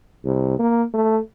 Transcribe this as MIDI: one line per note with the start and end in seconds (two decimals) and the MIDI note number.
0.25 0.56 36
0.59 0.84 58
0.94 1.18 57